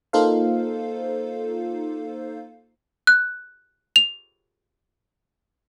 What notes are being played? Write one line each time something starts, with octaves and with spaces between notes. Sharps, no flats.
A#3 D#4 F4 A4 C5 F5
F#6
F7